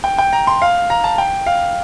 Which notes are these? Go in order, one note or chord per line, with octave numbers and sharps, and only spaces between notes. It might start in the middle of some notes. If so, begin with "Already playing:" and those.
G5
G5
A#5
C6
F5
A#5
A5
G5
F5